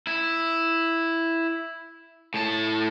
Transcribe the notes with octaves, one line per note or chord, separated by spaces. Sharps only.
E4
A2 A5